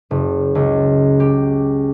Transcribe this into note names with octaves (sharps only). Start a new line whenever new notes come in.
F#1
C#2
G4